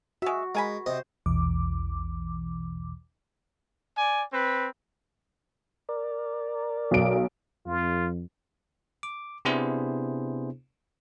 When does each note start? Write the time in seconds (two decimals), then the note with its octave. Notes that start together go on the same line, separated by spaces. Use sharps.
0.22 G#3 F#4 E5
0.55 G#3 A#4 G#5 B5
0.86 C3 C5 D#5
1.26 A#1 E2 B2 E3 D6
3.97 D5 G#5
4.32 C4 B4
5.89 A#4 D5
6.91 B1 D7
7.67 F2 F4
9.03 D6
9.45 C3 B3 D4 E4 G#4 C5